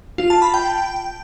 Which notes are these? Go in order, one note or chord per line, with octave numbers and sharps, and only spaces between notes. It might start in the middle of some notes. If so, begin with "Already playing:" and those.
F4
A5
B5
G5